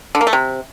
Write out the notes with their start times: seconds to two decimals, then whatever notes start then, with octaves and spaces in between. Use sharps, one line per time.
0.15 D3
0.21 A#3
0.27 A3
0.33 C3